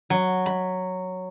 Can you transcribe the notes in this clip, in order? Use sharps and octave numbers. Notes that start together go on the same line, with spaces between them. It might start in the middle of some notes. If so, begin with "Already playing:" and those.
F#3
B5